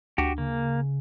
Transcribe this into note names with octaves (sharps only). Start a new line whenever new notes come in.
D2 D4 F#4 G4
C#3 A#3